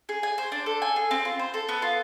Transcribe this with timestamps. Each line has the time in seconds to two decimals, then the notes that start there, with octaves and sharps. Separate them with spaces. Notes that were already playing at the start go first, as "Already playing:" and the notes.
0.09 G#4
0.23 G#5
0.38 C5
0.52 D4
0.66 A4
0.82 G#5
0.96 G#4
1.11 C4
1.25 F4
1.39 C5
1.54 A4
1.69 B3
1.82 F4